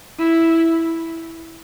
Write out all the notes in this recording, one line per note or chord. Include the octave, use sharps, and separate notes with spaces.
E4